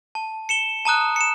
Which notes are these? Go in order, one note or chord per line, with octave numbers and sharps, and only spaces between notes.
A5
C#7 E7 G7
A5 A#5 D#6 F#6
C#7 E7